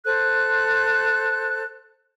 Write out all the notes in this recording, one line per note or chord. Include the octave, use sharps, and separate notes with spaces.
A4 C5 F#6